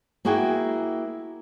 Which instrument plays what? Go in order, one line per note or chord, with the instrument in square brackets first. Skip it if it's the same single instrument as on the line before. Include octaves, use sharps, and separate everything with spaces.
[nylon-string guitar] A#3 E4 F#4 G#4 G5